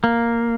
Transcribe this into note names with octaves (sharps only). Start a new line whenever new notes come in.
A#3